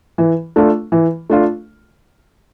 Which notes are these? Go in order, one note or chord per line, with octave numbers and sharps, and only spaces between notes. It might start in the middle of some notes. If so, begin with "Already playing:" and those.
E3
A3 D4 F4
E3
A3 D4 F4